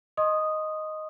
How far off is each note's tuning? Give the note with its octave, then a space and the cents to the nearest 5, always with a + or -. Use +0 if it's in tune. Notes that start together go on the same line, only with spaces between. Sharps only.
D#5 +0 C6 +30 D#6 -5